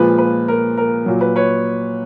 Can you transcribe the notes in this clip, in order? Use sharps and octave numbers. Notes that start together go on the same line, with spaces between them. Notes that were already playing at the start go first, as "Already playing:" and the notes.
Already playing: A#2 F3 G#3 B4
B4
A#4
A#4
A#2 F#3
B4
B4 C#5